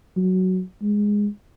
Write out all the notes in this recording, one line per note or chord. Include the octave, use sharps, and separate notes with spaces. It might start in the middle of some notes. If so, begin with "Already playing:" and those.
F#3
G#3